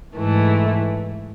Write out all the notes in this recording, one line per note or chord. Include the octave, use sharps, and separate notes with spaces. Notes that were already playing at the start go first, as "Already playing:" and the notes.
G#2 E3 A3 E4